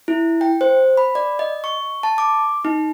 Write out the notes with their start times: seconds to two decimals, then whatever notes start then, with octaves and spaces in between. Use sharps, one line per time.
0.08 E4
0.41 G5
0.61 C5
0.97 B5
1.15 D5
1.39 D#5
1.64 C#6
2.03 A5
2.18 D6
2.65 D#4